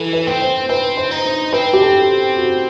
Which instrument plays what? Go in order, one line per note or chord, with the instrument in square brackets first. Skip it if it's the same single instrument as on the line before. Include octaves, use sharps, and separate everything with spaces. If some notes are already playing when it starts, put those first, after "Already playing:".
Already playing: [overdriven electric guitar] E3 [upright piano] A4
[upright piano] B4
[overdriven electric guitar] C4
[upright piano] C5
[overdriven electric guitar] C4 [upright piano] B4
[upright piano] C5
[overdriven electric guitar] D#4
[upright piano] C5
[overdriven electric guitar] C4 [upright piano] B4
[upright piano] G4
A4
F#4